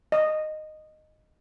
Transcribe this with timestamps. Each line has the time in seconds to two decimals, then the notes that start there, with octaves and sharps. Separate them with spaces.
0.12 D#5